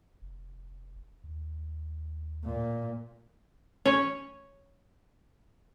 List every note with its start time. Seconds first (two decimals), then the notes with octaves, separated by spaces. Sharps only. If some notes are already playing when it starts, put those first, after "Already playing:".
0.22 F1
1.24 D#2
2.45 A#2
3.86 C#4 C#5